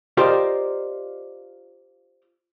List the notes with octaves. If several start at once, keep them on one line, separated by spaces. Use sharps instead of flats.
F4 G4 A#4 C5 D5 D#5